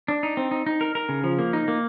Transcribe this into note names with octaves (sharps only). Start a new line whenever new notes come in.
D4
D#4
C4
D#4
D#4
A#4
A#4
C#3
F3
A#3
D#4
A#3